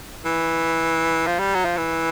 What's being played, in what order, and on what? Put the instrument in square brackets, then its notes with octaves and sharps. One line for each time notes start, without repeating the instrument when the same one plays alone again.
[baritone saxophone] E3
F3
G3
F#3
F3
E3